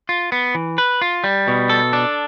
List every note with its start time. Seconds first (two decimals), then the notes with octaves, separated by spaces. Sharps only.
0.09 F4
0.32 B3
0.55 E3
0.78 B4
1.02 F4
1.24 G3
1.48 B2
1.70 A4
1.93 D4